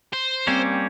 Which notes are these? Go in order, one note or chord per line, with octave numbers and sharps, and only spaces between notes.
C5
G3 A#3 C4 C#4